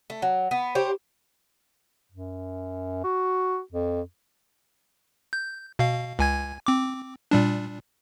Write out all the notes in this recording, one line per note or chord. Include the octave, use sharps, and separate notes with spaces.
A3
F#3
B3
G4 C5 C#5 G5
F#2
F#4
F2
G6
B2 F5
C#2 G#5 G#6
C4 D6
A#2 G3 D4